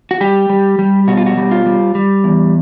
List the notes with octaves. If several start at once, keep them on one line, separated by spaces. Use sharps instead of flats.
F#4
G3 G4
G3
G3
B2 F#4
F4
F#4
G3
F4
G3
G3
E2